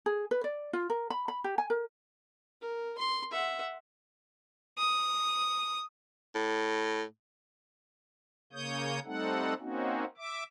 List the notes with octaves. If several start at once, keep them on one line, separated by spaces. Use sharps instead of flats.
G#4
B4
D5
F4
A#4
B5
B5
G4
G#5
A#4
A#4
C6
E5 F#5
D#6
A2
C#3 A#3 C#5 D#6 G6
G3 A3 C4 D#4 A4 F#5
A#3 C4 C#4 D#4 F#4
E5 D6